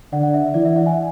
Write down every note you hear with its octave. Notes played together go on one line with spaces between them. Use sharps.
D3 D5 F#5
D5 F#5
E5
E5
E3 D5
E5
D5 F#5
E5 G#5